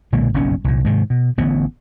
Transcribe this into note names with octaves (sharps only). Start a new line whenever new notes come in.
B1 A#2 D3 G#3
F#1 B1 G2 C#4
C2 A#2
G#2 C3 D#3
B2
A1 D3 B3